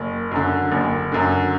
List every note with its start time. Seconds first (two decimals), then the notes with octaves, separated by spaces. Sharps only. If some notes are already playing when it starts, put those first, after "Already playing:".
Already playing: F#1
0.31 F#2 D3
0.72 F#1
1.12 F#2 D3